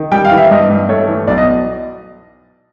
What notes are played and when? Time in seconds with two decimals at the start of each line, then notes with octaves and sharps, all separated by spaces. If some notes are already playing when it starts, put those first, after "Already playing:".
Already playing: D#3
0.12 G3 G5
0.25 F5
0.31 E3
0.38 E5
0.51 G2 D#5
0.70 G2
0.89 A3 C#5
1.08 E3
1.27 B1 D5
1.38 D#5